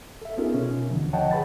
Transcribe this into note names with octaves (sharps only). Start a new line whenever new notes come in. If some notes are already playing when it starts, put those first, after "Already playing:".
A4 E5
B3 C#4 D#4 F4 G#4 A#4
B2 C#4
D#2 D3 E3 F3
C#5 D#5 F#5 G5 A5
G#4 B4 B5 A6